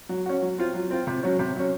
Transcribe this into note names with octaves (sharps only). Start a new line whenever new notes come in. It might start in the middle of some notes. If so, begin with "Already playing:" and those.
F#3
C#4 F#4
F#3
C4 F4
F#3
C4 F4
C3
F#3 C#4
C3
F#3 C#4